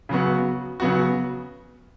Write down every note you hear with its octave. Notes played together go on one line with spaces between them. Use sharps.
C#3 F#3 B3 F#4
C#3 F#3 B3 F#4